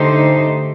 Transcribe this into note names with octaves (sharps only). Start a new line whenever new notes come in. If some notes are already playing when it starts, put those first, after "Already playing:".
Already playing: D3 A3 D#4 G4 C5